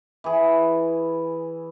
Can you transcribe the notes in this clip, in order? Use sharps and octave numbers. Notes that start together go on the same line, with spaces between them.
E3 G#4